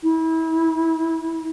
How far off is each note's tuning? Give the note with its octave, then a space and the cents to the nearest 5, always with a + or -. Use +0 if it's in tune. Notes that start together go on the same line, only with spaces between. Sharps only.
E4 -30